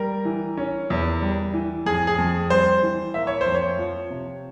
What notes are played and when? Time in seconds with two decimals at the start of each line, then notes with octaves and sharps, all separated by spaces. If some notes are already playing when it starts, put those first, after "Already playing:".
Already playing: G3 A#4
0.25 E3
0.58 C#4
0.90 E2
1.22 G3
1.54 E3
1.86 F2 G#4
2.07 G#4
2.18 F2
2.50 G3 C5
2.83 E3
3.14 A#3 E5
3.27 C#5
3.41 C5
3.46 F2
3.55 C#5
3.78 F3
4.11 C3